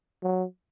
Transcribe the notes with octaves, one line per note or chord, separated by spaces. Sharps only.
F#3